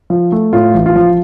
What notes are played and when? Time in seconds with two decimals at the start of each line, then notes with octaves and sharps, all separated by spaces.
0.10 F3
0.32 A3
0.53 A2 F4
0.74 A1
0.86 F4
0.96 F3